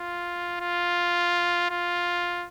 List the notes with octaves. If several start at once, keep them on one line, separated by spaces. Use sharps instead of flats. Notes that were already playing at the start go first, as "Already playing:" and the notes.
Already playing: F4
F4
F4